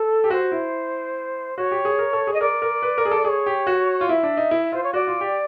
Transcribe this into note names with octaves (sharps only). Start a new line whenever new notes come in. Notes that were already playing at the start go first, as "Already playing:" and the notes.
Already playing: A4
G4
F#4 C5
E4
F#4 C#5
G4
G#4
A#4
A4
G#4
D#5
A#4 D5
A#4
B4
A#4
G#4
A4
G#4 C#5 D5
G4
F#4
F4
E4 E5
D4
D#4
E4
F4 C5
C#5
F#4 D5
F4
G4